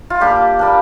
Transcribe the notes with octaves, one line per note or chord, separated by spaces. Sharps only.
F4
G3 A#3 D4 G4
G3 A#3 D4